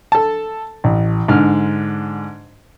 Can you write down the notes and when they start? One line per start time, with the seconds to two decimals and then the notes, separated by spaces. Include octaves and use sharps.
0.12 A4 A5
0.84 A1
1.28 G#2 D3 F6